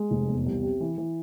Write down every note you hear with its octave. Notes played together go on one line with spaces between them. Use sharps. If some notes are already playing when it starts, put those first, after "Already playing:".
Already playing: G#3
F1
E2
C2
C3
E3
E3